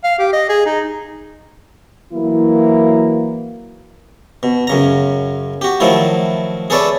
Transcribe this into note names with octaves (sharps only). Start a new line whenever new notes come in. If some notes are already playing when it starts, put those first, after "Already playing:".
F5
G4
D#5
G#4
D#4
E3 F#3 A#3 E4
B2
F#2 C#3 A#5
F#4 G4
D#3 F3 F#3 A3 E4 F4
G#4 A4 B4 C#5 D5 E5